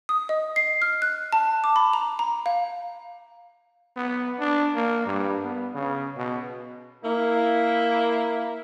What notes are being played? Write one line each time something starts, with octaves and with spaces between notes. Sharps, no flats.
D#6
D#5
C7
F6
F#6
A5
D6
B5
A#5
A#5
F5
B3
D4
A#3
G2
B3
C#3
B2
A#3 E4